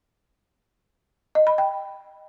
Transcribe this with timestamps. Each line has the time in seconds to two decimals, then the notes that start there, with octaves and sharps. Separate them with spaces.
1.35 D#5
1.47 B5
1.58 G5